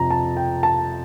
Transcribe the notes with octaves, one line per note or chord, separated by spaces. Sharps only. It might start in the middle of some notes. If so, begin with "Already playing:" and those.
Already playing: F2 C3 F3 A#5
A5
G5
A5